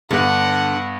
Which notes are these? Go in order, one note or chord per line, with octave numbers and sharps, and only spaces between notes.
G2 D3 B3 F#5